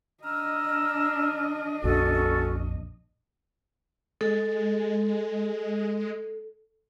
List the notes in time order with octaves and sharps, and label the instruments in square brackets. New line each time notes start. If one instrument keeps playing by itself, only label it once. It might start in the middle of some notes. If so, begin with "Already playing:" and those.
[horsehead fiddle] D4 D#5 [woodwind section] A#5 E6 F6
[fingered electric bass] A#1 F2 A#2 [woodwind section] C#4 F#4 [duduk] A4
[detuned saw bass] G#3 [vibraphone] A4